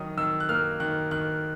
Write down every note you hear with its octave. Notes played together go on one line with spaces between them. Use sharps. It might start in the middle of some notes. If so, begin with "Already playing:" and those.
Already playing: D#3 F#3 D#6
D#3 E6
F#6
A#3 F6
D#3 F#6
D#3 F#6